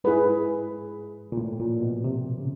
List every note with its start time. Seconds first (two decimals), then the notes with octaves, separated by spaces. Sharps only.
0.04 G#2 E4 G#4 B4
1.32 A#2
1.37 A2
1.60 A#2
1.81 B2
2.04 C3
2.38 C#3